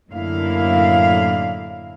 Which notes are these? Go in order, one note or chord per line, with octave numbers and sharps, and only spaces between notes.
F#2 A2 D3 A#3 E4 F5